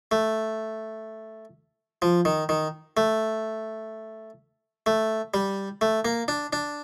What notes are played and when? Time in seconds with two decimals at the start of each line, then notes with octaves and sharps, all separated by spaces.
0.11 A3
2.02 F3
2.25 D#3
2.49 D#3
2.97 A3
4.86 A3
5.34 G3
5.81 A3
6.05 A#3
6.28 D4
6.53 D4